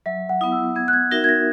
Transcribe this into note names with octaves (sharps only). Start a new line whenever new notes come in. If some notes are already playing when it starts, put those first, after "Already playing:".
F#3 E5
F#5
B3 E4 D#6
E6
B3 G#6
F#6
G#6
D#4 F#4 A#4 E5 A#6
G#6
A#6